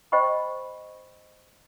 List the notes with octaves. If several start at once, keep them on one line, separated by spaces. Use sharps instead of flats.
C5 D#5 G5 B5 C#6